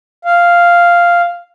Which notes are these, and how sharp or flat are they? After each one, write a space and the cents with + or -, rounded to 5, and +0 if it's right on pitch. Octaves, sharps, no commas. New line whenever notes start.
F5 -5